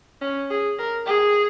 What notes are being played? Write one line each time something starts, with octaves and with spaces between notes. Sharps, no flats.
C#4
G#4
A#4
G#4